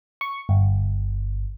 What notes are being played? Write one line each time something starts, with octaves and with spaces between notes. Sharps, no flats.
C#6
G1